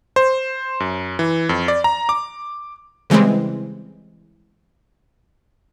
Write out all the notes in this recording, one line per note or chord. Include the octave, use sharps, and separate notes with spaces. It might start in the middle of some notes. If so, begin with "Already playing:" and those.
C5
F#2
E3
F2
D5
A#5
D6
C#3 E3 G3 G#3 C4